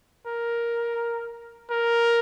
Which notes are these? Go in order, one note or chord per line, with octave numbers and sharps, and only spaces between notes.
A#4
A#4